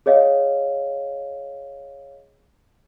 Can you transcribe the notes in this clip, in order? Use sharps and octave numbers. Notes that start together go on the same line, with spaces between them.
G#4 C#5 D#5 F5